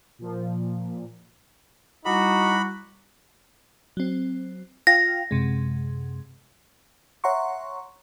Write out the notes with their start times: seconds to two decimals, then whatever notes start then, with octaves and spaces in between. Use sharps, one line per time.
0.19 A#2 F3
2.05 G3 D#4 E4 F#4 B5 D6
3.97 F#3 C4
4.87 F4 F5 G5 A#6
5.31 F#2 C3 G#3
7.24 C#5 E5 F#5 A#5 C6 C#6